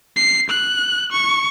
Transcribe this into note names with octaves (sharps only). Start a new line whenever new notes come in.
C7
F#6
C#6